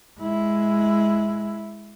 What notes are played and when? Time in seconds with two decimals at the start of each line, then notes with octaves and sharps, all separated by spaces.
0.20 G#3 E4